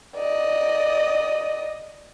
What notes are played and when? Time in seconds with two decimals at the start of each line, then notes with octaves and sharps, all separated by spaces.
0.16 D5 D#5